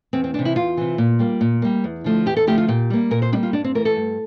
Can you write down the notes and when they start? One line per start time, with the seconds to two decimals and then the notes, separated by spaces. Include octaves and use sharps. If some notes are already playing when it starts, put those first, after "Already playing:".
0.13 E2 C4
0.24 C4
0.34 C3 E3 D4
0.45 E4
0.55 E2 F4
0.77 C3 E3
0.98 A#2
1.19 G3 A#3
1.41 A#2
1.62 G3 A#3
1.84 E2
2.04 D3 F3 A3
2.26 E2 G4
2.36 A4
2.47 D3 F3 A3 G4
2.58 F4
2.68 A#2 G4
2.90 G3 A#3
3.11 A#2 A#4
3.22 C5
3.32 G3 D4
3.37 A#3
3.43 F4
3.53 G2 D4
3.64 C4
3.75 E3 A3 A#4
3.85 A4
3.96 G2